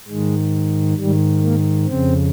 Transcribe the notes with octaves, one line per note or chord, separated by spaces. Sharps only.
G#2 D#3 G#3
G#2 D#3 G3
A#3
F2 C#3 C4